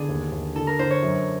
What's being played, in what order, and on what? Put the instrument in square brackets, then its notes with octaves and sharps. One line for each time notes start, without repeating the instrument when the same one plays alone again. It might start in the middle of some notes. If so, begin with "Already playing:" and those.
Already playing: [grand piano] D3 [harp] B3 D4 G#4
[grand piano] D#2
D#2
[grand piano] D3 [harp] A4
[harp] A#4
[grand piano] D3 [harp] C5
[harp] C#5
[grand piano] F#2